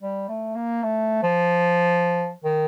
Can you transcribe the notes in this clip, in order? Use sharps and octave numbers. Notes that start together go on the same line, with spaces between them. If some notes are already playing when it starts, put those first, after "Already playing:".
G3
A3
A#3
A3
F3
D#3